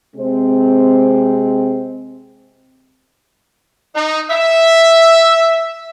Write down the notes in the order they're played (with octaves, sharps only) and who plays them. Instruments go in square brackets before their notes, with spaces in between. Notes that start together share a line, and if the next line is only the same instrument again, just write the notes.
[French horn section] C3 G#3 C4
[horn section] D#4
E5